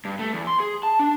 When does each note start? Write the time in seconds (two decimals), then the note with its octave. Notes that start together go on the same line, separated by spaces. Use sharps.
0.05 G2
0.19 A3
0.33 E2
0.47 C6
0.60 G#4
0.83 A5
0.99 D4